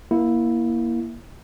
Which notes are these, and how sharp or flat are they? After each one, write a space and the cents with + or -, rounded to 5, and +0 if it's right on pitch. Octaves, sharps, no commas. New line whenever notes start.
A#3 +20 E4 +0